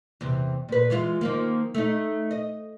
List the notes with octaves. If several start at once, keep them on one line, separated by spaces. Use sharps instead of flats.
E2 C3
A#2 B4
E3 G#3 F4
D#3 F3 A#3
A3 D#4
D#5